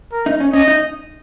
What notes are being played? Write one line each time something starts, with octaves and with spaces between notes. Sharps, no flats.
A#4
D#4
C#4
C#4 D#5
D#4